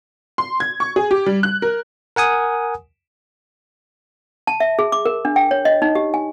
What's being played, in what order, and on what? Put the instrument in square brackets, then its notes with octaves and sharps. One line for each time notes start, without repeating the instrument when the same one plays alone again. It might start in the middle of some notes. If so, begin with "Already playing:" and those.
[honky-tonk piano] C6
G#6
C#6
G#4
G4
G3
F#6
A#4
[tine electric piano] A#4 F#5 G#5 D#6
[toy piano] A5
E5
G#4
D6
A#4
D4
G5
C#5
D#5
D#4
G4
G#5